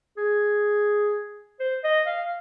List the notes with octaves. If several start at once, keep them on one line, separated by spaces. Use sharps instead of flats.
G#4
C5
D#5
F5